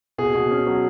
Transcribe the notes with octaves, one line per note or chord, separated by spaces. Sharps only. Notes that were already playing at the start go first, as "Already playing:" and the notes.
B2 G#4
B2
C#4
F#3